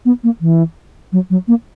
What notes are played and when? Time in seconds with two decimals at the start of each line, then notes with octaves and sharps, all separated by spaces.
0.05 B3
0.23 A#3
0.41 E3
1.12 F#3
1.30 F#3
1.48 A#3